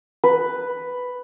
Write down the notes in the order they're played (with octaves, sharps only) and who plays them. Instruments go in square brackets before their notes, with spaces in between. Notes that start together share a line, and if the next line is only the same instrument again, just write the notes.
[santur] B4